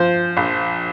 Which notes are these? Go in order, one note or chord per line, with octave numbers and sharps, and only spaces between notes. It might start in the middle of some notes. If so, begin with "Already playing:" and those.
Already playing: F3 C5
A#1